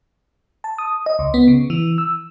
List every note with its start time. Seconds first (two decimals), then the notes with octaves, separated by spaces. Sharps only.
0.64 A5
0.78 D#6
1.06 D#5
1.19 C#2
1.34 B3
1.48 C#3
1.70 E3
1.98 E6